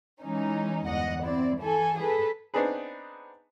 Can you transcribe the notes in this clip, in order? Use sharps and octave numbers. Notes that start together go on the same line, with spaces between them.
E3 G#3 C#4 D#4
G1 E2 G#2 D#5 F#5
C4 E4 D5
E3 A4 G#5
G#4 A4 B4
B3 C4 D4 D#4 G#4 B4